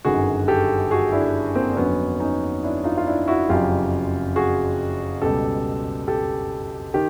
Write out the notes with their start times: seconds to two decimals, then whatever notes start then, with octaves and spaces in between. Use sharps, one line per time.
0.05 G1 F#2 D#3 F#3 F#4 G#4
0.48 G4 A4
0.91 F#4 G#4
1.12 D4 E4
1.55 A#3 C4
1.72 D4
1.77 F2 D3 F#3 B3 C#4
2.20 C#4 D#4
2.63 D4 E4
2.84 D#4 F4
2.97 F4
3.07 D4 E4
3.28 E4 F#4
3.49 F#1 F2 C#3 F#3 F4 G4
4.36 F#4 G#4
5.22 C#2 B2 G3 G4 A4
6.08 G4 A4
6.94 D#3 G4